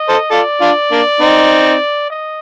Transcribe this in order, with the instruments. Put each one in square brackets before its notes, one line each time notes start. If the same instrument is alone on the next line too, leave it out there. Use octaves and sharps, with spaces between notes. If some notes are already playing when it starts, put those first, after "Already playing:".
Already playing: [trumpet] D#5
[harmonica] A4 C5
[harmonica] F4 A4 [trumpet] D5
[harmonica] D4 F4
A#3 D4
C4 D#4
[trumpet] D#5